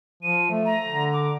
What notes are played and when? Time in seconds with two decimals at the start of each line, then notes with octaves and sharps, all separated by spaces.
0.23 F3 D#7
0.51 A3
0.65 A#5
0.88 D3
1.13 D6